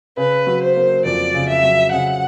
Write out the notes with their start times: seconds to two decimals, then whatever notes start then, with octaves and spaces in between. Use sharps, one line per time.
0.17 C#3 B4
0.47 F#3
0.61 C5
0.76 A#3
1.05 F2 D5
1.34 C#3
1.48 E5
1.63 F#3
1.92 C#3 F#5